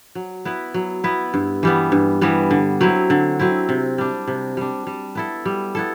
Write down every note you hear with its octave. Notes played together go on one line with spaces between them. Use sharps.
F#3
B3 E4 B4
F#3
B3 E4 B4
G2
E3 G3 B3
G2
E3 G3 B3
D3
F#3 C4 E4
D3
F#3 C4 E4
C3
G3 D4
C3
G3 D4
G3
B3 E4 A4
G3
B3 E4 A4